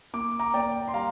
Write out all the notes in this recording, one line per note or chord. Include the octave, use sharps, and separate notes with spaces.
A#3 D6
A#5 D6
A#3 D5 G5
C6
G3 F5 A#5